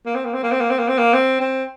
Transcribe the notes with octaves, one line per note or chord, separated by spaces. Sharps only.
A#3
C4
A#3
C4
A#3
C4
A#3
C4
A#3
C4
A#3
C4
C4